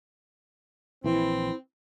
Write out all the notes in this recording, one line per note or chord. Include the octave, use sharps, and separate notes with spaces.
A#1 E3 C4 E4